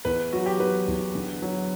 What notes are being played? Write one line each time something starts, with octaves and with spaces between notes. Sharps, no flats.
E2 B4
F#3 F#4
G4
F#3 B4
E2
D3
F#3